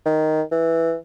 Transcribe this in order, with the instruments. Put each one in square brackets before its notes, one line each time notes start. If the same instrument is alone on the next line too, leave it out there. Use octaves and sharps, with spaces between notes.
[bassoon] D#3
E3